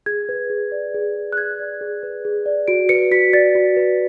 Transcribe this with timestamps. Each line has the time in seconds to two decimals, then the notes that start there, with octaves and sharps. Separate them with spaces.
0.06 G#4 G#6
0.29 B4
0.50 G#4
0.72 D5
0.94 G#4
1.16 B4
1.32 F#6
1.37 G#4 G#6
1.59 D5
1.81 G#4
2.03 B4
2.25 G#4
2.46 D5
2.68 F#4 D7
2.89 B4 C#7
3.11 F#4 B6
3.33 D5 A6
3.55 F#4
3.77 B4